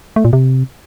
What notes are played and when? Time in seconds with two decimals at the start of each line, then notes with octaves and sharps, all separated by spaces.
0.16 A3
0.25 A#2
0.33 C3